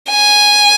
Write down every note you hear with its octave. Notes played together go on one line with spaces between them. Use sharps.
G#5